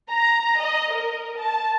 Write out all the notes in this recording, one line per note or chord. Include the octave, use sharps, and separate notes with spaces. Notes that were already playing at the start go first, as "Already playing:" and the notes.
A#5
D#5
A#4
A5